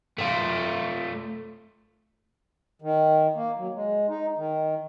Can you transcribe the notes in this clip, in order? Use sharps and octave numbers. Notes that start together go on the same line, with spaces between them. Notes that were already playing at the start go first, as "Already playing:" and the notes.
A3 F4
D#3
A#3
F#3
G#3
D#4
D#3